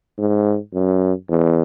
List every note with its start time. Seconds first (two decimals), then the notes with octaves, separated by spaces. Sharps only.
0.18 G#2
0.74 F#2
1.29 E2